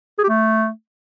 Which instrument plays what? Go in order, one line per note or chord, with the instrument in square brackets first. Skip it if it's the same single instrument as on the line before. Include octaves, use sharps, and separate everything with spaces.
[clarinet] G#4
G4
A3